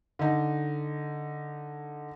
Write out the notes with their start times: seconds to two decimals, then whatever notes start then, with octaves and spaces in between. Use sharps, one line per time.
0.19 D3 D#4